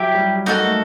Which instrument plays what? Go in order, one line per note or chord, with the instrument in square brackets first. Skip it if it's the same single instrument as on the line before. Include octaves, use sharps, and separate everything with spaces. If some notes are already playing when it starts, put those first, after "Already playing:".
Already playing: [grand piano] F#3 [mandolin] E4 G4
[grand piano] G3
[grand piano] A#3 [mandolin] D#4 F#4 A4
[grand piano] A3